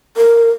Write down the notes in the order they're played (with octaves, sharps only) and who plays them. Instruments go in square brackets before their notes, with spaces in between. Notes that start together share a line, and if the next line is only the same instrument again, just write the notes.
[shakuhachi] A#4